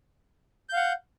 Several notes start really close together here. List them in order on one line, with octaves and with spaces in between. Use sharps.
G6 F5 F#5